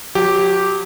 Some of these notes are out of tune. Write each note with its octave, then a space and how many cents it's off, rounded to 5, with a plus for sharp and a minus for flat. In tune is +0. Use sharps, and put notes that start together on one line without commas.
F#3 -35 G4 -5